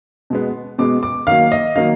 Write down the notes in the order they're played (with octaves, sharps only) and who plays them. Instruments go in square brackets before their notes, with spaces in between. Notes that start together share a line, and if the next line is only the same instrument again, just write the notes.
[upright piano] B2 G#3 B3
B2 G#3 B3 D6
D6
D#3 F#3 A#3 F5
D#5
D#3 F#3 A#3 F5